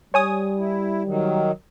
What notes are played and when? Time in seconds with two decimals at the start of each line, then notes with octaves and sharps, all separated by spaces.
0.14 G3 C#5 G#5 D#6
0.58 E4
1.06 D#3 F#3